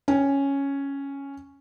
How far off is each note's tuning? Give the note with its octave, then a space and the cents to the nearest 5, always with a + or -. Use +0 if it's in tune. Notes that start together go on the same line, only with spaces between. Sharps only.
C#4 +0 G5 +25